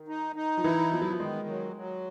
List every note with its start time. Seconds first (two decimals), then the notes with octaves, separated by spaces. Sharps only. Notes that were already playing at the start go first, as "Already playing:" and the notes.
Already playing: D#3
0.08 D#4
0.36 D#4
0.57 F3
0.64 E3 E4
0.92 F3 B3
1.02 F#3
1.11 F3
1.20 D#3 G#3
1.48 F#3
1.76 F#3